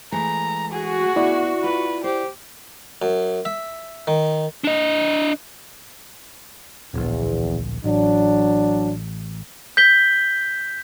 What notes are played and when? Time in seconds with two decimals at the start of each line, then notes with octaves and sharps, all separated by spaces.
0.12 E3 G#3 A3 A#5
0.72 F#4 G#4
1.16 B3 E4 D5
1.64 F4 B4
2.04 G4 C5
3.02 F#2
3.45 E5
4.07 D#3
4.64 D4 D#5
6.94 D1 A#1 E2
7.84 A1 F#3 D4
9.77 G6 B6 G7